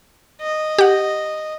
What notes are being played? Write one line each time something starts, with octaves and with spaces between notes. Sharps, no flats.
D#5
G4 F#5